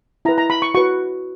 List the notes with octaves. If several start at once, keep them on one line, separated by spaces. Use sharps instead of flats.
E4 B4 A#5
A#5
B5
C#6
F#4 B4 C#6